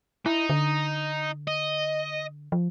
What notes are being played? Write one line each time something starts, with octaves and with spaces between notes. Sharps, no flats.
D#4 E4
D3
D#5
F3